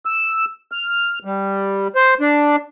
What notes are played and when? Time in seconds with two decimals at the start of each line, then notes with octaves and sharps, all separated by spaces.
0.05 E6
0.72 F6
1.25 G3
1.95 C5
2.21 D4